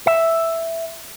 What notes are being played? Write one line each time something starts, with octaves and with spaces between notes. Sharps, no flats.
E5